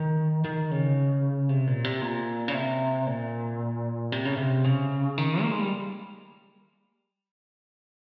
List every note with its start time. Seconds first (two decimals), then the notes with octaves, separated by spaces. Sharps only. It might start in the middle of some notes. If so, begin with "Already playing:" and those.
Already playing: D#3
0.45 D#3
0.71 C#3
1.49 C3
1.67 A#2
1.84 C3
2.02 A#2
2.48 C#3
2.54 C3
3.07 A#2
4.12 C3
4.25 C#3
4.37 C3
4.65 C#3
5.18 D#3
5.41 A#3
5.51 G#3
5.60 G3